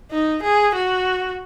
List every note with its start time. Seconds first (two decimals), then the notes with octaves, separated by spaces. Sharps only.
0.11 D#4
0.43 G#4
0.74 F#4